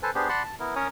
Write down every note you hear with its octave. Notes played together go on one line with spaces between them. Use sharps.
A4 B4 C5 G#5 A5
B3 D4 G4 G#4 C5
D5 F#5 A5 B5 C6
A5
B3 E4 A#4
C#4 A#4 C#5 D#6